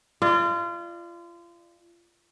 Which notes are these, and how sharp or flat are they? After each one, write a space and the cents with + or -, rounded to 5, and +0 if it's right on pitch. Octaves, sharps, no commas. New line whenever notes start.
F4 -30 D5 +30